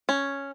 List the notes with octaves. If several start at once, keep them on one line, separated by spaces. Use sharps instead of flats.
C#4